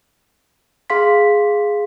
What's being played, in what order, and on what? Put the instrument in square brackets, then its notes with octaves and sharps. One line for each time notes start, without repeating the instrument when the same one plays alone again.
[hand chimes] G#4 F5 C6 B6